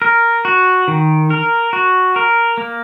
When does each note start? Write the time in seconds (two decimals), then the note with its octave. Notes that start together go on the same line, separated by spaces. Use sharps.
0.02 A#4
0.45 F#4
0.88 D#3
1.30 A#4
1.73 F#4
2.16 A#4
2.57 A#3